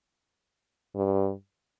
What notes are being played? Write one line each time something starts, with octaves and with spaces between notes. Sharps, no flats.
G2